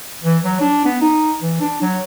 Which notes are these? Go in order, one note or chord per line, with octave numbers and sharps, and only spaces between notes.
E3
F#3
D4
B3
D#4
E3
D4
F#3